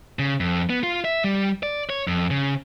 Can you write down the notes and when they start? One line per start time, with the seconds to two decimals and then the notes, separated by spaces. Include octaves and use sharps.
0.19 C#3
0.40 F2
0.70 B3
0.83 F4
1.05 E5
1.24 G3
1.63 D5
1.90 C#5
2.08 F2
2.30 C#3